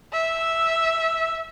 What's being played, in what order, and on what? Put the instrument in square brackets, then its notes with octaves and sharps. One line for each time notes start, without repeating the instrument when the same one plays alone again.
[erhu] E5